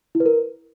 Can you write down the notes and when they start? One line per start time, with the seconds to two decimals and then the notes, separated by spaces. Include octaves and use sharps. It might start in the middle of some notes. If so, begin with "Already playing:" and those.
0.15 E4
0.20 B4
0.26 A#4